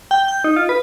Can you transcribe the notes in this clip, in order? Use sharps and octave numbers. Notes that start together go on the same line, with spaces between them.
G5
G6
D#4
F4
B4